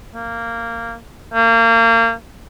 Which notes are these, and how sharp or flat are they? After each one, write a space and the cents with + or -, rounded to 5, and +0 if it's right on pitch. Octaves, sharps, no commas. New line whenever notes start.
A#3 -15
A#3 -30